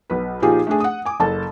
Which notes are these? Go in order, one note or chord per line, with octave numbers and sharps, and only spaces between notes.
B1 B4
A#2 F3 D#4 F4 G4 G#4
A3 D4 G#4
F#5 D#6
G#5 D6
F#1 A4 A5